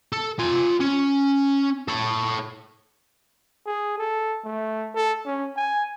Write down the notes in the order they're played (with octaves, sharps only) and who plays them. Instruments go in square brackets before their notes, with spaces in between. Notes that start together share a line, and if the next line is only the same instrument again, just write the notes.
[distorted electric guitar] A4
F4 G#5
C#4
A4 C#5
[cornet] G#4
A4
A3
A4
C#4
G#5